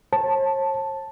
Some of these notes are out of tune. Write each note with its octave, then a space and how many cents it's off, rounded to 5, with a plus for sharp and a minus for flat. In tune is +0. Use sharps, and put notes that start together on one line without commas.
C#5 -45 A5 +0